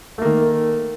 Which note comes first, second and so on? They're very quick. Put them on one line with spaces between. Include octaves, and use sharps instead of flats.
A3 A#3 D#3